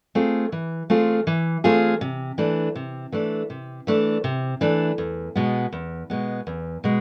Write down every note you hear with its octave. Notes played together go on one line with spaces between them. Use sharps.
A3 C4 F4 G#4
E3
A3 C4 F4 G#4
E3
A3 C4 F4 G#4
C3
E3 A3 D4
C3
E3 A3 D4
C3
E3 A3 D4
C3
E3 A3 D4
E2
B2 G#3 B3
E2
B2 G#3 B3
E2
B2 G#3